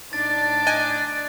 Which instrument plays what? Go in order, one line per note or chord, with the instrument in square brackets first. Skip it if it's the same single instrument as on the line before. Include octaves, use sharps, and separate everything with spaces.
[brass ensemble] A2 D#4 A5 [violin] D4 D5 [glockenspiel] A6
[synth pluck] D#5 G#5 [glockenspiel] F#6